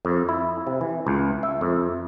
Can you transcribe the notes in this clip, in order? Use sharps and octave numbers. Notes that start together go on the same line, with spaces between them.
F2
E4
C3
E3
C#2
E5
F2